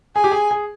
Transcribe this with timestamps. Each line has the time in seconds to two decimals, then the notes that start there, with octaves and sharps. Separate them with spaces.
0.15 G#4 G#5
0.24 G4
0.32 G#4
0.51 G#4